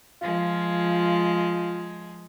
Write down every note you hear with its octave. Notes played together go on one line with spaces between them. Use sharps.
F3 G#3 F4